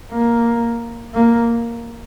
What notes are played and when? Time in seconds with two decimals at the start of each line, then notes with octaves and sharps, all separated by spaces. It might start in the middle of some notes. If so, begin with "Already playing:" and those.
0.12 A#3
1.14 A#3